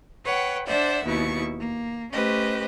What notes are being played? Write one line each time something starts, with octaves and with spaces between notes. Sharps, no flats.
B4 C#5 F#5 G5
D4 C5 D5 E5 F#5
D#2 B2 E4 C#6
A#3
A3 C#4 G4 B4 C5 D#5